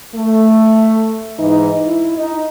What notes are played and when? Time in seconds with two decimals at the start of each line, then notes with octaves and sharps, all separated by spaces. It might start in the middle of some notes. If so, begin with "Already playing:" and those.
0.15 A3
1.39 G#2 E3 D#4
1.87 E4
2.17 D#4